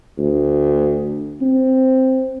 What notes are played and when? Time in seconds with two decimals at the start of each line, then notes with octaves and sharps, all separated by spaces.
0.18 D2
1.41 C4